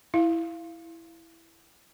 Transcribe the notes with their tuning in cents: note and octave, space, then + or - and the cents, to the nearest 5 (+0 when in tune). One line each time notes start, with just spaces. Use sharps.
E4 +0 F5 -15